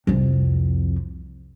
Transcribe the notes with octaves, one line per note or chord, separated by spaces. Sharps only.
C2 F2